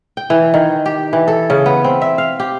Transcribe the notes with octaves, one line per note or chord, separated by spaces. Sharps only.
G5
E3
D#3
G4
E3
A4
C#3
B3
C4
E5
F5
G4